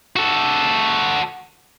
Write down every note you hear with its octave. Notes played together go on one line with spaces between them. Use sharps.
F#4 A4